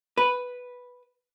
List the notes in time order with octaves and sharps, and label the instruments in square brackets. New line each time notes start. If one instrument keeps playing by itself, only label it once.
[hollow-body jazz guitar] B4